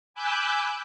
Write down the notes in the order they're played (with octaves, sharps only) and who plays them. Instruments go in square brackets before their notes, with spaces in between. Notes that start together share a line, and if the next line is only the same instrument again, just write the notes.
[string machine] G#5 B5 D6 E6 F#6 G6